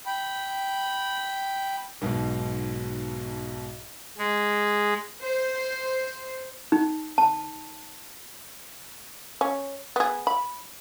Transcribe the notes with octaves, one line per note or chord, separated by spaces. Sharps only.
G5 B5
B1 G#2 B2
G#3
C5
D#4
A5
C#4
B3 G#4
B5